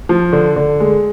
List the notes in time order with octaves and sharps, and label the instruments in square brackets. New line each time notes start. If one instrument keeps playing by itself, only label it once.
[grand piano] F3
D3
D3
G#3